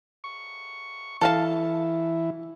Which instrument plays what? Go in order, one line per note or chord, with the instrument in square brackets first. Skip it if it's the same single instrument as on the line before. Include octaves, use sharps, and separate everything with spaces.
[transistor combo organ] C#6
[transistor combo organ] E3 E4 [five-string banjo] A4 F5 A5